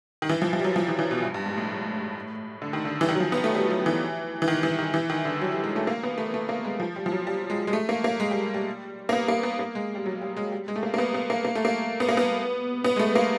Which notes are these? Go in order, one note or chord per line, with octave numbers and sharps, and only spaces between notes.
D#3
E3
F3
F3
G3
F#3
F3
E3
E3
B2
G2
G2
G#2
A2
D3
D#3
D3
E3
D#3
F#3
F3
B3
A3
G3
F#3
E3
E3
D#3
E3
D#3
E3
D#3
D3
F#3
G3
G#3
A3
A#3
B3
A3
A3
A#3
G#3
F3
G3
F3
F#3
G3
G#3
G#3
A3
A#3
A#3
G#3
G3
G3
A#3
B3
A#3
B3
A#3
G#3
G3
F#3
G3
G#3
G3
G#3
A3
A#3
A#3
B3
B3
A#3
A#3
A3
A#3
B3
A#3
B3
B3
G#3
A3
A#3